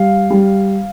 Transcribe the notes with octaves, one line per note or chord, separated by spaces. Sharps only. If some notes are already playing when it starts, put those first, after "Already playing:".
Already playing: G3 F5
G3